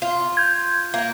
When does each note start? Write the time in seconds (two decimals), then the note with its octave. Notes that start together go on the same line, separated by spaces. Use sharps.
0.02 F4
0.37 G6 G#6
0.94 A#3